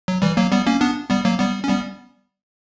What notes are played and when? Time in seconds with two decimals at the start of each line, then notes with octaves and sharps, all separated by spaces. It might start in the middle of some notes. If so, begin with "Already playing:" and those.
0.08 F#3
0.22 E3 G3
0.37 F#3 A#3
0.52 G3 B3
0.67 A#3 C#4
0.81 B3 D4
1.10 G3 B3
1.25 F#3 A#3
1.39 G3 B3
1.64 C#4
1.69 G3 B3